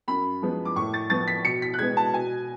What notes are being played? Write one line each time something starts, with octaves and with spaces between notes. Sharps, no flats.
F#2 B5
F3 G#3 B3
D6
A2 C#6
A6
F3 B3 A6
B6
B2 C#7
B6
F#6
G#3 B3 G#6
A5
B2 G#5